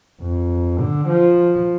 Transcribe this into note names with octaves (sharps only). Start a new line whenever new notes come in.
F2
D3
F3